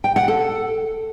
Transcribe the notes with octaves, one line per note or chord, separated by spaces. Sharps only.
G5
F#5
A4